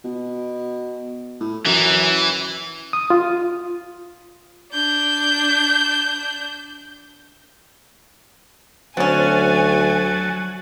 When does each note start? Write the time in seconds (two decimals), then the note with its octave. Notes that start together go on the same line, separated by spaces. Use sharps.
0.04 B2
1.40 A2
1.66 F#2 E3
2.93 D#6
3.10 F4
4.73 D4 G6
8.97 D2 F#3 C4 C#4 F#4 G#5 A5